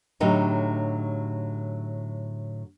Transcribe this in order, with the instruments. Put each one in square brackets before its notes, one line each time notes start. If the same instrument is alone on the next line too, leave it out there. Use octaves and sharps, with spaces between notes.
[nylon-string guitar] A2 D3 F#3 D#4 G4